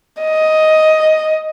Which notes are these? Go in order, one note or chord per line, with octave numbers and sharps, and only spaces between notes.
D#5